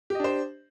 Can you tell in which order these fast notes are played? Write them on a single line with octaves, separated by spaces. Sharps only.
G4 D#5 D4 C5